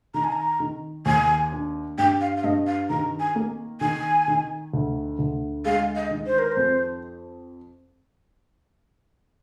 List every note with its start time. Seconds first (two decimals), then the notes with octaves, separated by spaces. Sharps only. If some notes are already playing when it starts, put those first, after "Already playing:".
0.14 D#3 A#5
0.24 G#5
0.32 A#5
0.60 D#3
1.06 D#2 G#5
1.52 D4
1.98 G2 G5
2.21 F5
2.37 F5
2.44 G2 D#5
2.67 F5
2.90 D#3 A#5
3.20 G#5
3.35 A#3
3.81 D#3 G#5
4.28 D#3
4.74 D2
5.19 D2
5.65 G#3 F5
5.96 D#5
6.11 D#3
6.26 C5
6.39 A#4
6.52 C5
6.57 F2